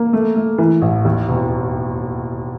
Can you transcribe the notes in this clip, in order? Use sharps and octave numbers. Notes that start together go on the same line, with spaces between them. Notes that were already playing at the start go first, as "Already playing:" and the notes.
Already playing: A#3
A3
A3
E3
A1
D#2
E1